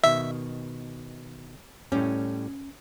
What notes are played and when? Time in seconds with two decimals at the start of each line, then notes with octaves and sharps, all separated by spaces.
0.04 B2 D#3 E5
1.92 A2 G3 C#4